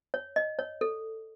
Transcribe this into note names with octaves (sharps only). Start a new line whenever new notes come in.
C#5
D#5
C#5
A4